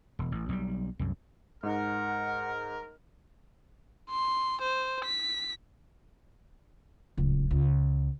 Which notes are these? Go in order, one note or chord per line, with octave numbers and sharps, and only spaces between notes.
E1
A1
B1 G3
C2 F#2
G#2 D#4 A#4 F#5 F6
C6
C5
B6
D1 C#2
C#2